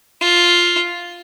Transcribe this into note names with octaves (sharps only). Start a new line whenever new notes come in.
F4